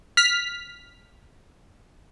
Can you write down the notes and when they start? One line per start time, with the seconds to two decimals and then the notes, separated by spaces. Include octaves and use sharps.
0.17 F6 B6